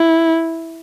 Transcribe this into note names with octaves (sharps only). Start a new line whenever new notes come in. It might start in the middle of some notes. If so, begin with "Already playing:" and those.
Already playing: E4